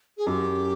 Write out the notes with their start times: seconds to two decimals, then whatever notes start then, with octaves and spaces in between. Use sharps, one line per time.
0.17 G#4
0.27 F#2 G4